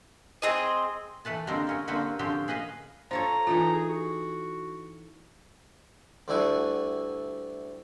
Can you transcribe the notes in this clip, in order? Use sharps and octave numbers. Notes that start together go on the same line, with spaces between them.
C4 G#4 D#5
E3 A3 B4 A5
D3 G3 G#3 A#3 C4 A#4
A#3 C#4 A#4
D3 G3 A#3 C4 F#4 B4
D3 F3 C4 C#4 F#4 G4
G#4 B4 D#5 F5
F4 A4 C5 C#5 A#5
E3 D#4 F4 A4
G#4
F#4
D2 D3 G3 E4 F#4 G#5